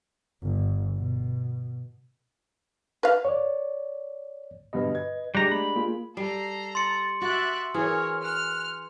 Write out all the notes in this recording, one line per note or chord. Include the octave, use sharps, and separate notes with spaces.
G1
B2
B4 F5
C#5 D5
G2 B2 D3 B4 D#5
G#6
G3 G#3 D4 G4 A#5 F#6
A3 B5
A#3 F4 G#4
G3 A4 A#5 C7
C6 A6 C#7
F#4 E5 D6 F#6 A6
E3 G#4 A#4 C#5 F6
F6 F#6